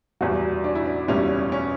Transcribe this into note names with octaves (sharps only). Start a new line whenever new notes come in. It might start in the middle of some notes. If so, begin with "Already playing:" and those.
F#1 E2 B2 F#3 G3 F#4
D4
E4
D4
F#1 E2 B2 G3 C#4
C#4